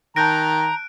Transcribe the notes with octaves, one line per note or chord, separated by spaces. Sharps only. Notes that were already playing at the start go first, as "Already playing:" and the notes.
D#3 A5 A#5 F#6 G6 A#6 D7